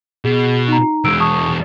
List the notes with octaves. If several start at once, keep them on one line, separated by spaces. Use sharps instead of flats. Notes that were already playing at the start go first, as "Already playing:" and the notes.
B2 G#4
D#4 A#5
E2 G#3 E6 D7
A5 C#6 D#6